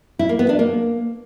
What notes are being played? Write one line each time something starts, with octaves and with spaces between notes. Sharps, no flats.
E4
A#3
B3
D4
A#3